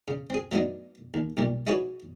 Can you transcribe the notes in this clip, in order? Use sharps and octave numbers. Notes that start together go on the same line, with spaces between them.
C#3
C4 G#4
F#3 A3 B3 D4 D#4
D#2
B1 A#2 G3
D#4 E4 F#4 G#4 B4 C#5